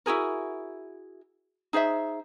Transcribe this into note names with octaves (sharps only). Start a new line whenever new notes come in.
E4 F#4 G#4 A#4
D#4 G#4 C5 E5